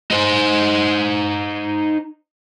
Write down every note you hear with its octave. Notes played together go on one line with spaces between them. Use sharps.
D#4 C5